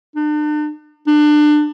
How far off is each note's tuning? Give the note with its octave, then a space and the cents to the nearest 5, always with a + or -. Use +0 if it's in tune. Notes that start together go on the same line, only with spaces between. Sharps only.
D4 +40
D4 +25